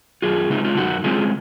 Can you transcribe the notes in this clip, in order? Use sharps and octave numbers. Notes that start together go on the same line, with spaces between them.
F#2 F4 G#4
C#3 G#3 C4 D#4
F4
F#2 D#4 F#4
C#3 G#3 C4 F4 G#4